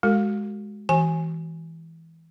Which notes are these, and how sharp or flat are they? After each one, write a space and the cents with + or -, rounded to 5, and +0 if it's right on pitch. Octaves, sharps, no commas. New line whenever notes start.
G#3 +0 F#4 +20 A4 +45
E3 -15 F#4 +45 G#5 +0